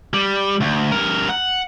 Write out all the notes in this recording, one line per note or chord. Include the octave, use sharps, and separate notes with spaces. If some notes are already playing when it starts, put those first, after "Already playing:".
G3
D2
G2 A#4
F#5